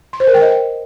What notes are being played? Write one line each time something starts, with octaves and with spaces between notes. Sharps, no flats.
C6
C5
A#4
G5
D#5